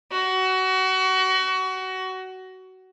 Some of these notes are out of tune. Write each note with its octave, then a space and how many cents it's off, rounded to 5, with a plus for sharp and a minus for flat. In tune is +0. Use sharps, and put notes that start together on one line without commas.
F#4 +25